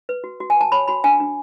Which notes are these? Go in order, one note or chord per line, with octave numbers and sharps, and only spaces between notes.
B4
F#4
F#4
G#5
B4 A5
C#5 B5
F#4 B5
D4 G#5
D4